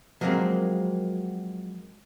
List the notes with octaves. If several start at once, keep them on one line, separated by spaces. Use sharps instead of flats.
F3 F#3 G#3 A#3 C4